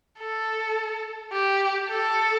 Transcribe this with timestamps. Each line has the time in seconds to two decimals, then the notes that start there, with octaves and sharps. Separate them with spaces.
0.19 A4
1.33 G4
1.89 A4